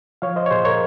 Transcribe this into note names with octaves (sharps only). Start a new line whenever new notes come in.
F3 C#5 F5
C5 D#5
C#5
A#2 G#4 C5
A#4 C#5